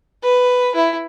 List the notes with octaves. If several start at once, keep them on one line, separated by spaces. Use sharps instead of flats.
B4
E4